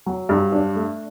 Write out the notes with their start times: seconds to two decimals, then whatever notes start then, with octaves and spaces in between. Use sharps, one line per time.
0.06 F#3
0.29 G2
0.52 D4
0.75 A3